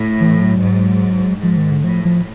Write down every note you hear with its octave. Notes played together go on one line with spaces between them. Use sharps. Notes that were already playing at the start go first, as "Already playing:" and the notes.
Already playing: A2
E3
F3
F#3
G#2
G#2 F3
D#3
D3
A2 F3
F3